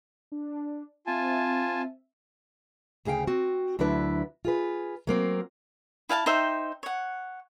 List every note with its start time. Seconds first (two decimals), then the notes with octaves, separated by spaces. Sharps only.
0.32 D4
1.07 C4 F4 E5 G#5 A5
3.05 D2 C#3 G#4 F5 G5
3.27 C4 F#4
3.79 D2 F#3 D4 E4 B4
4.45 F4 G#4 B4
5.07 F#3 A#3 C4
6.09 E4 F5 G#5 A5
6.26 D#4 C5 E5 G5
6.83 C#5 F#5